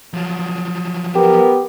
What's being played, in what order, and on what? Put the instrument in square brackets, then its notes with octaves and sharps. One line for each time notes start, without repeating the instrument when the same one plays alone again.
[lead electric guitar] F3 F#3
[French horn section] B3 A#4 [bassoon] G4